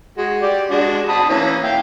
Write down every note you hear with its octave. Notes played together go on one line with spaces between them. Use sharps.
G#3 F#4
G4 D5
G#3 D4 F#4
A5 B5 D#6
E3 A#3 C#4
E5 F5 G5